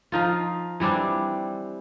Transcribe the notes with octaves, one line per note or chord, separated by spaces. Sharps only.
F3 D#4 F4
E3 G3 C4 D4